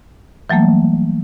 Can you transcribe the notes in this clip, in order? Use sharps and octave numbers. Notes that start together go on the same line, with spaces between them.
E3 F#3 G3 A3 A#3